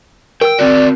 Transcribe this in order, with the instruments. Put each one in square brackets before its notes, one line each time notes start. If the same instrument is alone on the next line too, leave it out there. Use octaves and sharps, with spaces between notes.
[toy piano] A#4 E6 [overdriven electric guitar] G5
[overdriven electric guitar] C4 F#4 [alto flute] D5